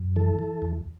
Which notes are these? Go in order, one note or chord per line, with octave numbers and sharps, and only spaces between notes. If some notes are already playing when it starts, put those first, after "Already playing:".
Already playing: F#2
E3 A4
E3
E2